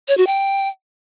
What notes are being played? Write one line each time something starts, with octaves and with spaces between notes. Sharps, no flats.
C#5
F#4
G5